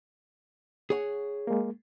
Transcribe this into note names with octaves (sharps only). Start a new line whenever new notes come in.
G#4 C#5 F#5
G#3 A#3